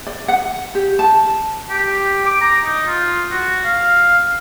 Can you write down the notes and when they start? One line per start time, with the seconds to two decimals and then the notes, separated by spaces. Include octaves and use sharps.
0.07 D5
0.28 F#5
0.75 G4
0.99 A5
1.70 G4
2.26 D6
2.41 A#5
2.65 D#4
2.87 F4
3.31 F#4
3.65 F5